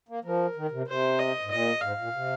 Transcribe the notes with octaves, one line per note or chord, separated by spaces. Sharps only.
A#3
F3 A#4
D#3
C3
C3 C5
D#5
G#2
A#2 D#5
G#2 F5
A#2
C3